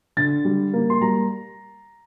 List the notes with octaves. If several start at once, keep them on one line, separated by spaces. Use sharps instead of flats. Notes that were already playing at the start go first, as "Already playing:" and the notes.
D3 A6
G3
A#3
C6
G3 A#5